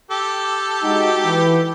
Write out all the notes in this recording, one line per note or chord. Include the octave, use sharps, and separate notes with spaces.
G4 A4
G#3 D#4 F#4
E3 B4